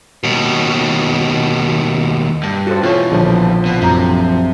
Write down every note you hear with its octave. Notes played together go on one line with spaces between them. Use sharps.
D#2 B2
G2
F#4 A4 C5
B2 E3 F4 C#5
A#1 D3 F3
B2
F#2 C3 A#5